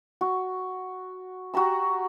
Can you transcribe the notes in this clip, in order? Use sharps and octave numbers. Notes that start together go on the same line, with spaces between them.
F#4
F#4 G4 A#5 E6